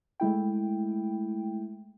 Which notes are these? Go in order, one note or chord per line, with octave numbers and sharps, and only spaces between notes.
G#3 A3 E4 G5